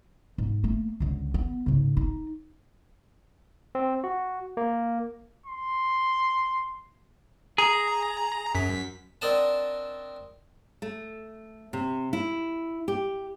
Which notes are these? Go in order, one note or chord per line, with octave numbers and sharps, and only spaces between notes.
G#2
A3 A#3
C#2 D3
B3
G#2 C#3
D#4
C4
F#4
A#3
C6
G#4 A#5
F#2 B6
C4 D4 A#4 D#5 F#5 A5
A3
C3
E4
G4